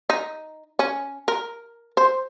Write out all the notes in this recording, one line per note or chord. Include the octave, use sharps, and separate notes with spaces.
D#4
C#4
A#4
C5